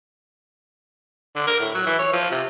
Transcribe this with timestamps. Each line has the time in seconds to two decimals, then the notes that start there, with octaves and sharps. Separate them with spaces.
1.36 D3
1.47 A#4
1.60 A2
1.74 F#3
1.86 E3
1.99 C#5
2.13 F3
2.31 C3